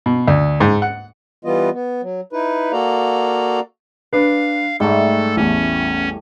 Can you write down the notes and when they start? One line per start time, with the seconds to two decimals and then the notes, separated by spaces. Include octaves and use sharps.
0.06 B2
0.28 D2
0.60 G#2
0.82 F#5
1.45 E3 G3 B3 F4 D#5
1.73 B3
2.02 F#3
2.33 D#4 E4 B4
2.72 A#3 F#4 A4 D5 F5 A#5
4.13 D4 B4 F5
4.80 G#2 G3 A3 A4
5.37 A1 E2 C#4